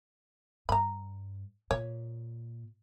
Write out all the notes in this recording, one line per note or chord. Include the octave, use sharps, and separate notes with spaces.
G2 A#5 B5
A#2 C#5